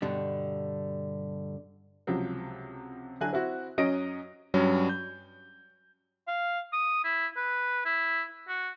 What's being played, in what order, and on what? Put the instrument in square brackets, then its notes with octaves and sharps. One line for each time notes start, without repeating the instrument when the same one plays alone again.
[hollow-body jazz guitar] G2 B2 D3 G3
[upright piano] C#2 C3 F3 F#3
D3 F#3 E4 F#4 G#5 F#6
C4 E4 F#4
F#2 F#3 C#4 D#5 A#6 D7
[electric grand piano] G2 F#3 G3 C#4
G6
[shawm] F5
D#6
E4
B4
E4
F#4